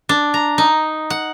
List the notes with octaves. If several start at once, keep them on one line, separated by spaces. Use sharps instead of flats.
D4
A#5
D#4
F#5